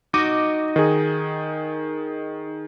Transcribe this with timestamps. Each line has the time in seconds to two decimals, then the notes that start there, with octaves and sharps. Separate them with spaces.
0.14 D#4 F#4 D#5 D6
0.76 D#3 G#4